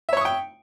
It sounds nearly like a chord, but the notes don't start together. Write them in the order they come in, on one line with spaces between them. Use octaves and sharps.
E5 C#5 C#6 D#6 G5